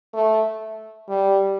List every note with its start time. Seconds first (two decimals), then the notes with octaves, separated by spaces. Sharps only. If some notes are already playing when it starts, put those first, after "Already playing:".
0.14 A3
1.08 G3